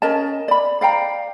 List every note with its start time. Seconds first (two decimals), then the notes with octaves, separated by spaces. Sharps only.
0.02 C#4 A#4 D#5 A5
0.48 D5 B5
0.81 D5 F5 G5 A#5